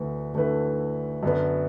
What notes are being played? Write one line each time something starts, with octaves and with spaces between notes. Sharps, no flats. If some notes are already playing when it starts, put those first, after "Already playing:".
Already playing: D2 D3 A3 E4 B4
D2 D3 A3 E4 B4
F#2 D3 B3 D4 B4